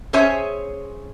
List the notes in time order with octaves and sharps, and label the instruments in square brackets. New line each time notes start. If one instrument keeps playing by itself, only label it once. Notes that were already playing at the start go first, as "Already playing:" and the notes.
[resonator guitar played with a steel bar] C#4 G#4 C5 C#5 E5 G#5